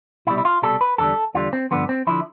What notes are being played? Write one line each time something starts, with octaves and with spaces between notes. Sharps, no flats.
C2 B2 G3 E4
E4
F4
C2 B2 G3 A4
B4
E2 D3 G3 A4
E2 D3 G3 F4
C4
G2 D3 F3 B3
C4
D3 F3 E4